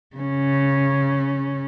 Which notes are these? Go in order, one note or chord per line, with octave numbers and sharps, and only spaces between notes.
C#3 C#4